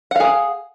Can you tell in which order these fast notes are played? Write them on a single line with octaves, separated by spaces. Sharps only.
F#5 F5 G#4